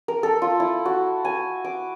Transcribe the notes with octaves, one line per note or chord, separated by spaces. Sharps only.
A#4
A4
F4
E4
F#4
G#5
D6